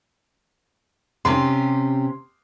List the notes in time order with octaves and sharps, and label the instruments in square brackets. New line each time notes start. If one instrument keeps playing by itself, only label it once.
[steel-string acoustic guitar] C3 C#4 G4 [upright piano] C6